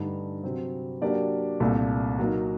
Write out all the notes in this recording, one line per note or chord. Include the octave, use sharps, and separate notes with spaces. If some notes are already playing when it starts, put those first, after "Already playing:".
Already playing: G2 D3 A3 D#4
C3 F#3 C4
F#3 A#3 D4 G4 D5
C2 A#2 A3
F#3 A#3 D#4